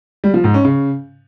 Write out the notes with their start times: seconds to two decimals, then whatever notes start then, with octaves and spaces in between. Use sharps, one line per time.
0.24 G3
0.34 F3
0.44 G#2
0.54 C#4
0.64 C#3